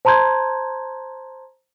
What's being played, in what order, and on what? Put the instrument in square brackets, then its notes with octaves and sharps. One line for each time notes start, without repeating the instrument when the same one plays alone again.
[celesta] C5 A5 A#5 C6 G6 G#6